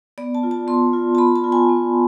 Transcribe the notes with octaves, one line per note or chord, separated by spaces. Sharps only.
B3 D5
A5
F4
A5
B3 C6
F4
A5
B3 B5
A5
F4
G#5
B3